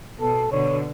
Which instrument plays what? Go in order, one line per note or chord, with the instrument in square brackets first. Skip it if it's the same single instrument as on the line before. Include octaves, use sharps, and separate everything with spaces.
[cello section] B2 [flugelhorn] A4
[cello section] B2 D3 [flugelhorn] C#5